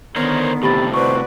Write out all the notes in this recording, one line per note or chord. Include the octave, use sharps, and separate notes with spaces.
D3 D#3 B3 A#4 C5 C#5
A2 C3 G4 B5 A6
F#4 B4 C5 D5 C#6